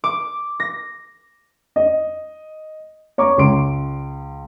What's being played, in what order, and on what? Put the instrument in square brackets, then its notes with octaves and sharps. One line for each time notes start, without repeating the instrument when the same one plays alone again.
[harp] D6
A#6
[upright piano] D#5
C#5 A#5 C#6 D6
C#2 C6 D7